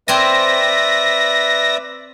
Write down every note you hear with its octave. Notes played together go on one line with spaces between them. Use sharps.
C4 B4 D5 E5 G#5 A#6